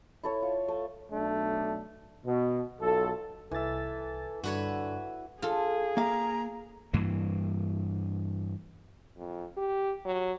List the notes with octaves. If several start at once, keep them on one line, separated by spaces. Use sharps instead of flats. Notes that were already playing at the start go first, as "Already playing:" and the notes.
E4 A4 C#5
F4
A3
B1 A3 D4
B2
B1 F4 A4
C2 E3 A4 E5 A6
G2 D3 F#4 B4 C#5
F4 G#4 A4
A#3 F5 A#5
G2 E3 A#3
F2
G4
F#3